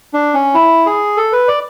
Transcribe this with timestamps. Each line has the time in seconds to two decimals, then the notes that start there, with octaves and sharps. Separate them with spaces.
0.14 D4
0.34 C#4
0.55 E4
0.86 G#4
1.17 A4
1.32 B4
1.48 D5